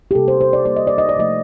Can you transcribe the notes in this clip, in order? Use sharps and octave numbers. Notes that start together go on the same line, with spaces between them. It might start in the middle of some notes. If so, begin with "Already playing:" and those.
G4
C3 G3 A#3 A4
C5
C5
D5
C3 G3 A#3 D5
D#5
D5
D#5
D5
C3 F3 A3 D#5